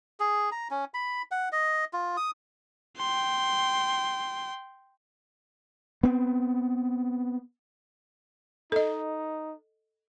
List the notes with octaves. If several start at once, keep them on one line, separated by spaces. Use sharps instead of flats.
G#4
A#5
C#4
B5
F#5
D#5
F4
D#6
G5 C6
B3 C4
D#4 A4 D#5